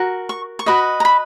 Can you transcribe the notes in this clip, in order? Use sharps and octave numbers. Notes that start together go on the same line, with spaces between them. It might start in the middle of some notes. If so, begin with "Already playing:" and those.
Already playing: F#4 A#4
C#6
C#6
F#4 B4 D#5 B5
A#5
B5